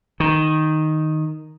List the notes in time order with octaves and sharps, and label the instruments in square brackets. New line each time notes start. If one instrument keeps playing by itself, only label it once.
[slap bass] D#3